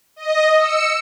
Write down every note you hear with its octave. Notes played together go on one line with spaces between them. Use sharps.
D#5
E6 C#7